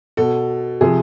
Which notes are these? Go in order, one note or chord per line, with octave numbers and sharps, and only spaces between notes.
B2 A4
C3 F3 G#4